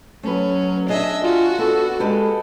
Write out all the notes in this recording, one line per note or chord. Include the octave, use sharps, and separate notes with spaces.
F#3 A3 C#4 B4
D4 G#4 D#5 E5
F4 F#4
B3 A4 D5
G#3 G4 A4 B4